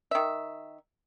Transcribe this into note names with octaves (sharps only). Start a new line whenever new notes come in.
D#3 E5